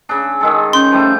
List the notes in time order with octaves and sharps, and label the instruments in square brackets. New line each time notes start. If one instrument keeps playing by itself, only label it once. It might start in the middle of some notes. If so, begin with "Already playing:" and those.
[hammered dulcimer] C#3 D4 [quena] E6
[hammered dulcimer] D#3 G#3 A4
[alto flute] C#4 [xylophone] C6 [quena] G6
[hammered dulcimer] F3 G3 A3